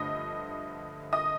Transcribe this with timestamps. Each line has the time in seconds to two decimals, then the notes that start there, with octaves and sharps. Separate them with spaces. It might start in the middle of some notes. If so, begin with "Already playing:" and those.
Already playing: G2 D3 F3 A3 D#5 D#6
1.13 D#5 D#6